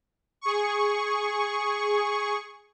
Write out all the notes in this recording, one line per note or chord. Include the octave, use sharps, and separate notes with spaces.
G#4 C#6